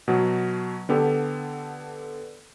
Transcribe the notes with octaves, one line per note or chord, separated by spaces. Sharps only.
B2 F#3
D3 B3 G4 A4